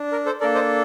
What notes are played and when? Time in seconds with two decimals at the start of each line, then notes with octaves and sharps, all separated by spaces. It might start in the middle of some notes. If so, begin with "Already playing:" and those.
Already playing: D4
0.12 A#4
0.26 A4 C5
0.40 A#3 D4 A4 A#4 D5
0.55 C5 D#5